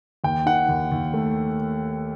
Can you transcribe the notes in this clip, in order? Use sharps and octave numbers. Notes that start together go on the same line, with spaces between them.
D#2 G5
D#3 F#5
D#2
D#2
A3